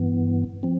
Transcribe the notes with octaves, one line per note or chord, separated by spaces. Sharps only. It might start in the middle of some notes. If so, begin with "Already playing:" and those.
Already playing: G2 E3 B3
F3 C4